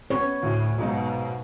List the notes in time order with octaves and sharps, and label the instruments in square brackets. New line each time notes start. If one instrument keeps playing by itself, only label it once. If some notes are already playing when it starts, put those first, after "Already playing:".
[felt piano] B3 C#4 [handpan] C#5
[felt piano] D2 [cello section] A2
[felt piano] B1 G#2 D#4 [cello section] B2